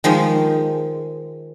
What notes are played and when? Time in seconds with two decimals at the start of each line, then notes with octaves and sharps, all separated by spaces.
0.04 D#3 F3 G#3